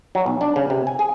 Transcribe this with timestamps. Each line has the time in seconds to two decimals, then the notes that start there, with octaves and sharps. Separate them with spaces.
0.15 F#3
0.26 B1
0.41 D4
0.56 C#3
0.70 C3
0.87 G#5
0.99 G#4